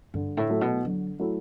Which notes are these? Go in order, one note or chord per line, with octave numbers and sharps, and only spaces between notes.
G2 D3
A2
F#3 A3 E4
B2
D3 F#3
F#3 A3 E4